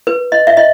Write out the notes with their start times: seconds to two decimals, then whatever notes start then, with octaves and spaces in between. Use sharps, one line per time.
0.07 B4
0.32 D#5
0.47 E5
0.57 D#5